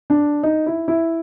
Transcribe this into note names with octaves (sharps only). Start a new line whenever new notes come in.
D4
D#4
E4
E4